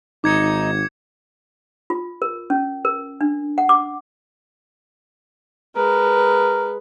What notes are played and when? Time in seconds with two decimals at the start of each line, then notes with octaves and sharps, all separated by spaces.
0.24 G#1 D#4 D6 G#6 C#7
1.90 F4
2.22 A#4
2.50 C#4
2.85 A#4
3.21 D4
3.58 F#5
3.69 D6
5.76 G#3 A#4 B4